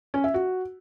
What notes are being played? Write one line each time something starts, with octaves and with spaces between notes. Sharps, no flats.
C#4
E5
F#4